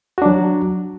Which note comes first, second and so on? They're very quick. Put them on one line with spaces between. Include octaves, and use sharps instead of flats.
F#4 D4 F#3